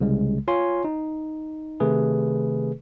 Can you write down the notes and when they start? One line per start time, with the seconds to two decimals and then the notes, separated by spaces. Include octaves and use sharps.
0.01 C2 C#3 G#3
0.48 F4 C#5 G#5 C6
0.84 D#4
1.80 C3 D#3 A3 G#4 B4